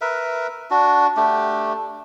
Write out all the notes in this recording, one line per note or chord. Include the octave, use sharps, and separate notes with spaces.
A#4 B4 E5
D4 F#4
A3 D4 G4